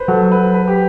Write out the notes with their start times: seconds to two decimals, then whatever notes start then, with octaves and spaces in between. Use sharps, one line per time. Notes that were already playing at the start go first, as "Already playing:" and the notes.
Already playing: B4 C5
0.08 F#3 A4
0.32 B4
0.54 B4
0.68 G4